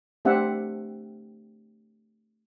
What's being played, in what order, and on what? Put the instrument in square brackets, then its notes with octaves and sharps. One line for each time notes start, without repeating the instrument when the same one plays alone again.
[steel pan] A3 C4 D4 G4 E5 F#5